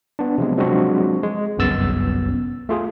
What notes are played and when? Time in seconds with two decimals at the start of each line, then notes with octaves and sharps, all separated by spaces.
0.19 B3 D4
0.38 C3 F3 F#3 G#3
0.57 F3 F#3 G#3 C4 D4 F#4
1.23 G#3
1.58 G1 C2 F#2 B3 E6 A6
2.69 A3 F4 G#4